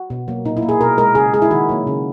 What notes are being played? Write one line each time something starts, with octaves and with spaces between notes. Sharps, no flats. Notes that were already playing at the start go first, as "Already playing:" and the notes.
Already playing: F#4
B2
F#3 A#3
A#2 D#4
E4
A#3
G#4
B2 A#4
G#3 A#4
C#3 G#4
G#3 G#4
E4
D#3 F#4
F#3 A#3
C#3